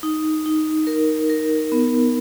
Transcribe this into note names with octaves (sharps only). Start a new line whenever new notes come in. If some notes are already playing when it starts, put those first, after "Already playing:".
D#4
D#4
A#4
A#4
B3